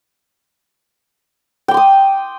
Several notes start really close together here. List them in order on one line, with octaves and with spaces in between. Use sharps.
G5 D6 C6 D#6